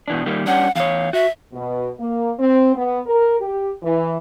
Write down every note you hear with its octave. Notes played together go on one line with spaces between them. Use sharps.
B2 E3 D4
D#3 G3 A#3
G3 C#4 D4 F#5
E2 C#5 F5
F#4 E5
B2
A#3
C4
B3
A#4
G4
E3